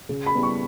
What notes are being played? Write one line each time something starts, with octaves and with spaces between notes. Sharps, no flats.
C#3
B5
G3 B3 E4
C#6